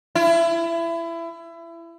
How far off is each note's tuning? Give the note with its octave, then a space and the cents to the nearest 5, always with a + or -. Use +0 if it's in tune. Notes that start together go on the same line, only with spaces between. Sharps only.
E4 +25